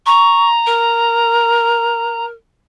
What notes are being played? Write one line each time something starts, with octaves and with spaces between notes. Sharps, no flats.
A#5 C#6
A#4